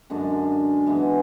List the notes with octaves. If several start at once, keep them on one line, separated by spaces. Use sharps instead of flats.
F#2 D3 G#3 D4
E3 G#3 B3